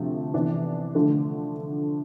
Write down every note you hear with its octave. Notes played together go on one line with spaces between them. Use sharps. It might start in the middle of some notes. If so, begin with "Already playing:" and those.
Already playing: D2 C3 F3 A3
C3 E3 B3 D4
D3 F3 A3